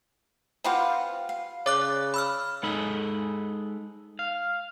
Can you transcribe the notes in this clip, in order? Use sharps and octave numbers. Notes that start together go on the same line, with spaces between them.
C4 F4 G4 B4 F5 F#5
F5
C#3 C#5 D5 D6 F#6
B5 E6 F6
G#3 D#4 A4 B5
F5